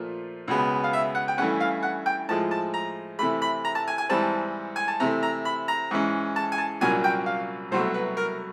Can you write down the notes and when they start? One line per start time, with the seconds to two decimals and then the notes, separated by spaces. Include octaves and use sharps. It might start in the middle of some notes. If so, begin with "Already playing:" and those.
Already playing: A#2 F3 A3
0.48 C#2 B2 G#3 B3
0.84 F5
0.93 E5
1.15 F#5
1.28 G5
1.38 G2 E3 A3 C#4 F#5
1.61 F5
1.83 F#5
2.06 G5
2.28 A2 F3 G#3 A5
2.51 A5
2.74 A#5
3.19 C3 E3 A3 B5
3.42 B5
3.65 A#5
3.75 A5
3.88 G#5
3.98 G#5
4.09 G#2 E3 G3 C4 A5
4.76 G#5
4.88 A5
5.00 C3 E3 A3 C4 A#5
5.23 A#5
5.45 B5
5.68 A#5
5.91 G#2 E3 G#3 C#4
6.36 A5
6.52 G#5
6.58 A5
6.81 C2 A#2 F#3 A#3 C#4 G#5
7.04 G5
7.26 F5
7.71 C2 B2 F#3 A3 C5
7.94 B4
8.17 A#4